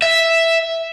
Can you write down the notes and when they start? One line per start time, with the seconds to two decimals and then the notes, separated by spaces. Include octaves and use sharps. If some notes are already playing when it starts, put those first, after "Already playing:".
0.02 E5